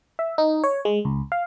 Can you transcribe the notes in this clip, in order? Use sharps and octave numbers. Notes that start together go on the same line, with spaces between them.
E5
D#4
C#5
G#3
C#2
F5